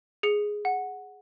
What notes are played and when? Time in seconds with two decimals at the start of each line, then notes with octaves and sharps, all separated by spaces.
0.23 G#4 C#7
0.65 F#5